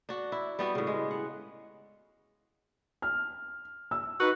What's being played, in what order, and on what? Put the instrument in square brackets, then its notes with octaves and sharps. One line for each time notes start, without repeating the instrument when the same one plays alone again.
[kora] D4 F#4
E4
G3 B3 F#4
A2 C#3
G#3
F#5
[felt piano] F6
E6
[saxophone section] D#4 F#4 B4